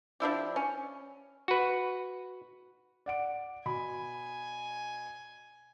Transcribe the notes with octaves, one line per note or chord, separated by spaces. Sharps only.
F3 D4 E4 G4
C#4
F#4 B4
D5 F#5 D7
B2 G#5 B5